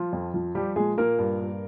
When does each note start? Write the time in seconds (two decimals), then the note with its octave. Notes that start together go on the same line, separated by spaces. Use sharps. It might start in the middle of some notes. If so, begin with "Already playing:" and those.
Already playing: F3 F4
0.13 F2
0.34 F3
0.55 F3 G3 G4
0.76 A#2 G#3 G#4
0.97 A#2 A#3 A#4
1.18 G2
1.40 G2